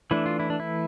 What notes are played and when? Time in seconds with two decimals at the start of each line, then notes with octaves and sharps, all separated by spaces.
0.11 E3 A3 D4 E4
0.26 F4
0.40 E4
0.50 D4
0.60 E4